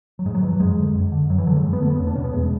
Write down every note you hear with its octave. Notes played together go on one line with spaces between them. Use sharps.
F#3
G#2 G#3
F#3
E3
F#3
F#2 G#3
D3
F#2
D3
F#2 F#3
E3
D3 F#3
G#3
F#2
B3
D3 A3
B3
E2 C#4
D4
B2 C#4
B3
E2 G#3